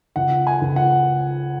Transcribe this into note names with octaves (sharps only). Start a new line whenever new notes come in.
C#2 F#5
G#5
C#2
F#5